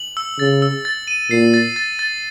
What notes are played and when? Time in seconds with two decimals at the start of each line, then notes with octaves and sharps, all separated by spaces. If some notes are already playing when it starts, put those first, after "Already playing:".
Already playing: F#7
0.17 E6
0.39 C#3 A6
0.62 E6
0.85 A6
1.08 D#7
1.30 A#2 C7
1.54 A6
1.76 A6
1.99 A6